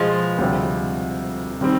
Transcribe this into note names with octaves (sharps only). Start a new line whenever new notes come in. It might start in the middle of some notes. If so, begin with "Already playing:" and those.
Already playing: B2 F3 G#3 B3
D2 C3 G3
D#3 G3 C4